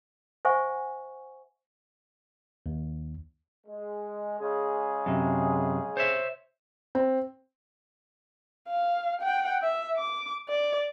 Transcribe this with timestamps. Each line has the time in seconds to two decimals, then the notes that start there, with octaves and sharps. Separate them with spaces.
0.45 C5 E5 F#5 G#5 C#6
2.66 D#2
3.67 G#3
4.39 C#3 G#3 G#4
5.06 F#2 C3
5.97 C5 C#5 E5
6.95 C4
8.68 F5
9.21 F#5 G5
9.62 E5
9.97 D6
10.49 D5